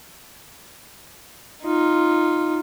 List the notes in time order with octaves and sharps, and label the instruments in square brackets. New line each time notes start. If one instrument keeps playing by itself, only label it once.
[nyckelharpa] D#4 F4